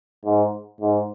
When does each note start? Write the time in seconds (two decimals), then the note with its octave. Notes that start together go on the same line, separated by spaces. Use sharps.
0.25 G#2
0.81 G#2